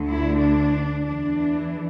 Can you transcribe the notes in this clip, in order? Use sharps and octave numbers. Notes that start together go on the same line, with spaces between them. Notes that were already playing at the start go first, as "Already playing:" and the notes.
Already playing: D2 D3
E4
D4
E2 E3 D4